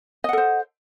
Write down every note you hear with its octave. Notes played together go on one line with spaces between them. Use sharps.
A4 C5 D#5 F#5